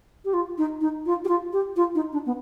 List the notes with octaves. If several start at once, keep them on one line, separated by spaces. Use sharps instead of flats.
G4
F4
D#4
D#4
F4
G4
F4
G4
F4
D#4
D4
B3